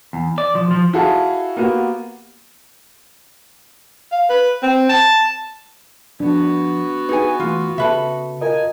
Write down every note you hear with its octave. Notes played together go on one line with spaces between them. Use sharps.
E2
D5
F3
F3
E4 F#4 G#4 A4 F5
A#3 B3 F#4 G4
F5
B4
C4
A5
F3 B3 D4 F#4
D#4 G#4 B4 G#5
E3 A3 F4
C#3 A4 B4 E5
F4 A#4 D#5 G#5